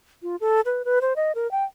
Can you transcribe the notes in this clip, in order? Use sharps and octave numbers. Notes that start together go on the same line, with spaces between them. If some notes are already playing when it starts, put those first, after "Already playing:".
F4
A4
B4
B4
C5
D#5
A#4
G5